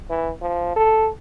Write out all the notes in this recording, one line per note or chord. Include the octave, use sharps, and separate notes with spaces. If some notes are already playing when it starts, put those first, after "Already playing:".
E3
F3
A4